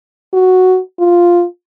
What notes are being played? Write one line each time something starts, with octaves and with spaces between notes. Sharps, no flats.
F#4
F4